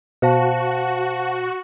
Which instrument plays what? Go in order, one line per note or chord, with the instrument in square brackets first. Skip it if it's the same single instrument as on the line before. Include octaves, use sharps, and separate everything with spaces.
[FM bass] B2 [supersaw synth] F#4 [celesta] C5 F5 A5